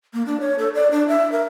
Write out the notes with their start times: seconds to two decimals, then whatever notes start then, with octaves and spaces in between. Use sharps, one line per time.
0.13 A#3
0.26 D4
0.40 C#5
0.59 A4
0.74 D5
0.91 D4
1.08 E5
1.32 A#4